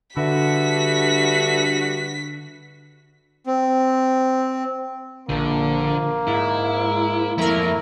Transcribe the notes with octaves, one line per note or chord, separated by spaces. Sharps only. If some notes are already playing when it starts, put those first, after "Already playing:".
G2 D3 F#4 A4 B4 E5 B6
C4
A#1 D3 A#3
G#2 E4
F2 A3 A#3 E4 A#4